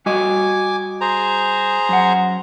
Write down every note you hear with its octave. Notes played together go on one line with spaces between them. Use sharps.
G3 F#4 D#5 G#5 D6
G#4 C5 A#5
F#2 F#5